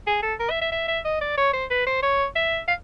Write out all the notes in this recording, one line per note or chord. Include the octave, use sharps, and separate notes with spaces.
G#4
A4
A#4
E5
E5
E5
E5
D#5
D5
C#5
C5
B4
C5
C#5
E5
F5